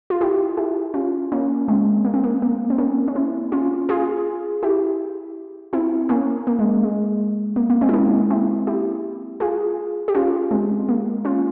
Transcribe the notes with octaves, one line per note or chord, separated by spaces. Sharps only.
F4
E4 G4
E4 G4
C#4 F4
A#3 C#4
G#3 C4
A#3
C4
A#3
A#3
C4
A#3 C#4
C#4
C4 E4
C#4 F4
F4 G#4
E4 G4
C4 E4
A#3 C#4
A#3
G#3
G#3
A#3
A#3
G#3 C4
E4
A#3 C#4
C4 E4
E4 G4
F4 G#4
G4
C#4 F4
G#3 C4
A#3
C#4 F4